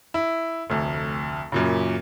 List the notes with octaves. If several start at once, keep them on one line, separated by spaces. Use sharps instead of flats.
E4
F1 D2
F#2 A#2 C#3